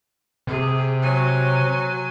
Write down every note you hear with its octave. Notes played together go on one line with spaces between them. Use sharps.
C3 G#4
F#3 G#5